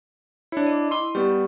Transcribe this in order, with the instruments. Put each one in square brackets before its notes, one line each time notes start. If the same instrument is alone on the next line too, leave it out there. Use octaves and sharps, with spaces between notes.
[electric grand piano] D4 E4 [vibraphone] C#5
[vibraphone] D#5 D6
[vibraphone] E4 D#5 B5 [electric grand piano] C6
[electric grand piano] G3 B3 [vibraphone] G4 C#6